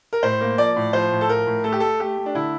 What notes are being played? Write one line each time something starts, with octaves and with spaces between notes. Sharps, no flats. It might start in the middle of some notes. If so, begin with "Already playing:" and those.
A#4
A2 C5
A#3
F3 D5
A2
F3 C5
A2
A4
F3 A#4
A2
A3 A4
G4
A3 A4
A3 G4
A3
D4
D3 E4